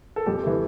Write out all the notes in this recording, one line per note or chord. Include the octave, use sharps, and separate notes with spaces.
A4
F2 G4
E3 A3